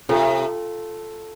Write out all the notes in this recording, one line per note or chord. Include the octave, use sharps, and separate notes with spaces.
C3 F4 A4